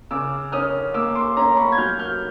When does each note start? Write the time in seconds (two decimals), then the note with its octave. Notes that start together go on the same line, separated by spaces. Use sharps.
0.11 C#3 D6 E6
0.52 C#4 D#6 F6
0.94 A#3 D6 E6
1.15 C6 D6
1.37 C#4 A#5 C6
1.57 B5 C#6
1.72 G#6
1.78 F#3 F6 G6
1.99 F6 G6